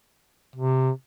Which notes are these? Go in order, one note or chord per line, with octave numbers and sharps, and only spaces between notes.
C3